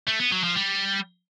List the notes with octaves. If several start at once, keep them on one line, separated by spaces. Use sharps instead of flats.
A3
B3
F#3
F3
G3